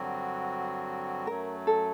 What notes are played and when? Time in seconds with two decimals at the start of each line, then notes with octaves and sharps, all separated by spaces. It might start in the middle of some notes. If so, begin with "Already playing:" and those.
Already playing: G2 D3 F#3 C4 F#4
1.27 F#2 F#3 A3 A#4
1.67 A4